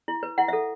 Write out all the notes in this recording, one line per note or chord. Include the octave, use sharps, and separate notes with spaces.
E4
B4
E4 F#5
A4 E5